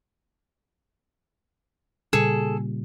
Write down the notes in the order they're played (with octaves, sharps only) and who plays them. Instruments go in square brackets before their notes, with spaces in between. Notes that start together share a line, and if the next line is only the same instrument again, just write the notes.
[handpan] A#2 C#3 G3 [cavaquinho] G#4 A4